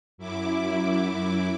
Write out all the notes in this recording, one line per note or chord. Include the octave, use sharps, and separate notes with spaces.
F#2 E4 D6